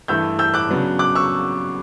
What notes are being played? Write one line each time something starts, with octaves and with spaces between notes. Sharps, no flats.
G2 E3 A3 E6 G6
E6 G6
D6 F#6
C#3 F#3 B3 D4
D6 F#6
C#6 E6